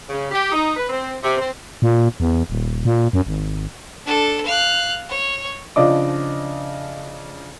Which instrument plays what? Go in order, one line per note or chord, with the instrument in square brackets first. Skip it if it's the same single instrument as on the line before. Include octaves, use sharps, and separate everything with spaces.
[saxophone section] C#3
G4
D#4
B4
C4
C3
C4
[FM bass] A#2
E2
D#1
A#2
F#2
G#1
[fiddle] D4 A4
F5 F#6
C#5
[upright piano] C#3 F3 D4 D#5 D6